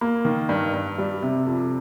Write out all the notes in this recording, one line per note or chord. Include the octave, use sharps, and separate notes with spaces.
A#3
D#3
G2
G2
G3
C3
F2